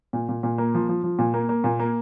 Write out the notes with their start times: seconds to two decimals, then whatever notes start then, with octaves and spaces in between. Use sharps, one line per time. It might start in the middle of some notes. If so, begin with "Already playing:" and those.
0.13 A#2
0.29 A#2
0.43 A#2
0.58 A#3
0.74 F3
0.89 F3
1.04 F3
1.19 A#2
1.34 A#3
1.49 A#3
1.64 A#2
1.79 A#3